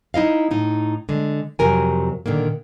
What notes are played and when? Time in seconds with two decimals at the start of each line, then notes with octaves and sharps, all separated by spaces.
0.14 D#4 E4 D#5 F5
0.51 A2 D#4
1.09 D3 G#3
1.59 F2 C3 F#3 A#4 G#5
2.26 A#2 D3 D#3 A#3